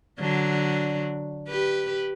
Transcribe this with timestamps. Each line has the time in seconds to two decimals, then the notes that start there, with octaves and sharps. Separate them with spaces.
0.19 D3 F#3 D4
1.48 G4 B4